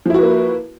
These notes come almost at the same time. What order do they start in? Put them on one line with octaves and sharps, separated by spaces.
F3 E4 F#4 B4 A#3